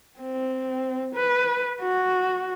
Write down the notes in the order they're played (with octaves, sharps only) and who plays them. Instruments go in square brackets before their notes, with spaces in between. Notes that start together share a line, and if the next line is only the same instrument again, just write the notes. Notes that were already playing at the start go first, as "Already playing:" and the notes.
[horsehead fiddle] C4
B4
F#4